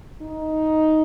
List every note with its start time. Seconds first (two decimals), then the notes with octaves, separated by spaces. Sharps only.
0.22 D#4